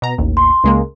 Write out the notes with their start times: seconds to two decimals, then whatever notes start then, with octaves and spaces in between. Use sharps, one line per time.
0.02 B2 A#5
0.18 A1 D#2
0.37 C6
0.64 C#2 G#3 A#3